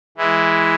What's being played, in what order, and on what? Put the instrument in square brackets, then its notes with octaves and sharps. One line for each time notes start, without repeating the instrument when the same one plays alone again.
[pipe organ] E3 G#3 E4